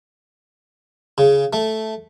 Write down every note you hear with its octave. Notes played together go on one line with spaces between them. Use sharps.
C#3
A3